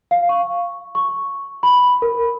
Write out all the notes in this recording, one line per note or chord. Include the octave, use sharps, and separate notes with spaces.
F5
C#6
C#6
B5
A#4